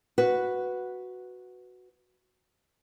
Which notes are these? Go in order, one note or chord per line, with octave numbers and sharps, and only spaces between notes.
F#4 B4